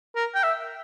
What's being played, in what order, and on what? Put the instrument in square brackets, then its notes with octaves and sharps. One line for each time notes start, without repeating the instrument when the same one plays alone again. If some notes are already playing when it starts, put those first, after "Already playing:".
[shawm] A#4
G5
E5